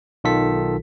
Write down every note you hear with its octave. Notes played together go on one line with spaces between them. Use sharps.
B1 D#3 F4 A4 B6